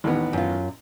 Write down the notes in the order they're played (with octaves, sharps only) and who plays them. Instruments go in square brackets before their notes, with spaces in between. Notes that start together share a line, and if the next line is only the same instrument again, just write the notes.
[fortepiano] A1 D#2 B3
[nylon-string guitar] F#2 F4